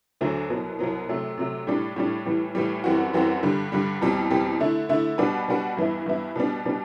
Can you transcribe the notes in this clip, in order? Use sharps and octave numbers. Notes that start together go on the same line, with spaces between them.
D2 D3 F#3 A3
C2 B2 F#3 B3
C2 B2 F#3 B3
C3 F#3 A3
C3 F#3 A3
A2 G3 D4
A2 G3 D4
A2 E3 G3
A2 E3 G3
F#2 E3 G3 C4 F#4
F#2 E3 G3 C4 F#4
G2 D3 G3
G2 D3 G3
E2 B2 G3 C4
E2 B2 G3 C4
D3 A3 E4
D3 A3 E4
B2 G3 D4 F#4 B4
B2 G3 D4 F#4 B4
G2 E3 B3 E4
G2 E3 B3 E4
B2 G3 B3 D4
B2 G3 B3 D4